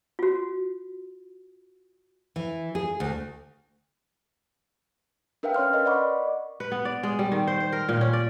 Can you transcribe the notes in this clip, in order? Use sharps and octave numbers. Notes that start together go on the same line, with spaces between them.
F4 F#4
E3
G#4
D2
D4 A#4 B4 E5 F5 G5
C#4 C#5 C6 F6
A#4 B4 D#5
D5 D#5 F#5 B5 C#6 D6
B4
B3
D5
G#3
G3
D#3
C5
C5
A#4
A#2
C#4
D5